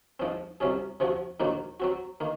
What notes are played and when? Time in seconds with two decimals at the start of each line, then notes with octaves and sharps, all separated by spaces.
0.20 G#2 F3 C4
0.60 C2 C3 F#3 C#4 G#4
1.00 C3 F3 C4 F#4
1.40 A#1 G#2 D#3 F#3 A#3
1.80 F#3 C4 F#4
2.20 D#3 A#3